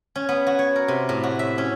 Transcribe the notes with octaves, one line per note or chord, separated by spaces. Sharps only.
C#4
B3
F#4
C#5
A#4
C3
A2
F#4
E5
C#4